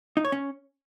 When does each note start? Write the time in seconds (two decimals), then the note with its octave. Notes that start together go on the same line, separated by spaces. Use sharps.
0.17 D#4
0.25 C#5
0.32 C#4